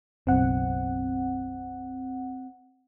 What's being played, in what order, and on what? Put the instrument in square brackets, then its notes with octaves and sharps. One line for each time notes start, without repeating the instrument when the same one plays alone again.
[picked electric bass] F#1 B1 [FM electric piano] C4 F#5